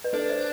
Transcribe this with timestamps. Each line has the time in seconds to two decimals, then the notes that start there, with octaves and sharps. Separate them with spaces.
0.04 B4
0.13 D4 A4
0.30 C5